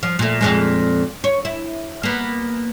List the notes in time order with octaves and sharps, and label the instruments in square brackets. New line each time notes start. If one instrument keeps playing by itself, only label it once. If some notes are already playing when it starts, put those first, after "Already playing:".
[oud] F3
A#2 A3
F2 A#2 G#3
C#5
E4
A#3 B3